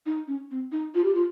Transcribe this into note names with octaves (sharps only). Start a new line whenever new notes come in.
D#4
C#4
C4
D#4
F4
G4
F4